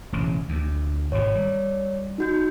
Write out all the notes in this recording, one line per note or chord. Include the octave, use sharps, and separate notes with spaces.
E1 A1 C#3
D2
G#1 B2 C#5
G3
D#4 F#4 G6